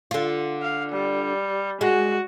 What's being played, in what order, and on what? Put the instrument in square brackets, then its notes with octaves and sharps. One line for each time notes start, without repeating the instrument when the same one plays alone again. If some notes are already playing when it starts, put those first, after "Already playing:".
[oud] D3 F4
[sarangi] F5
G3
[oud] G#3 [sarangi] F#4